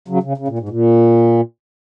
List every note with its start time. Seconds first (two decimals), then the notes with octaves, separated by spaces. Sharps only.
0.08 C#3 F#3
0.23 C#3
0.38 C#3
0.48 A#2
0.59 G#2
0.69 A#2